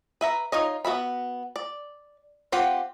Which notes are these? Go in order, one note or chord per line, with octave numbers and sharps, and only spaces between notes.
B4 E5 A#5
D#4 F4 C#5 D#5
B3 F#4 E5 B5
D5
C4 F4 G4 F#5